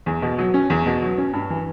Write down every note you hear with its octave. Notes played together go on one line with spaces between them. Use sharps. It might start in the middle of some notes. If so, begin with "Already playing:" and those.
E2
B2
F#3
C#4
E2
B2
F#3
C#4
G2
E3